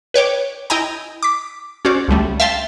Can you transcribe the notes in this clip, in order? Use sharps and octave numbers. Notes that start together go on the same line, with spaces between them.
B4 C#5 G5 D6
E4 D#5 G5 G#5 A#5
D6 B6
C#4 F#4 C5 D5
C#2 D3 G3 A3
E5 F5 G5 A5 C6 A6